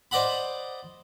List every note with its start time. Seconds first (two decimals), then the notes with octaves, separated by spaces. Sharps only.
0.11 C5 D5 D#5 F#5 B5